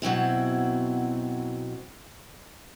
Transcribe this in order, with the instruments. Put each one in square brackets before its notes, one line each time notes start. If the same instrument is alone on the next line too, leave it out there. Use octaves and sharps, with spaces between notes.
[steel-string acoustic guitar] B2 F#3 C4 E4